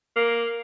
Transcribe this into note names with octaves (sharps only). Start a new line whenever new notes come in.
A#3